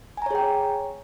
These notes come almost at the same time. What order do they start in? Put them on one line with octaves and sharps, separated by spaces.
G#5 A#5 C#5 G#4 G5